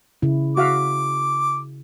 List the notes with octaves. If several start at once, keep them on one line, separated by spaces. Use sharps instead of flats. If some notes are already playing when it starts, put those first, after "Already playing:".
C#3 E4
F#4 E5 F5 D6